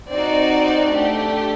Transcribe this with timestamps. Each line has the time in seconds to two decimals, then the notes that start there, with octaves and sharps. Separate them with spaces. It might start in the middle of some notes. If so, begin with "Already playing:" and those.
0.11 C4 D#4 F#4 D5
0.93 A3 D4 G4